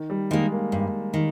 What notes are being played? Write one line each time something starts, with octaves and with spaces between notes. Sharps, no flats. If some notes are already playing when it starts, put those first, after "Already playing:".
Already playing: D#3
G3
D#3 G#3 A#3
A#3
G2
D#3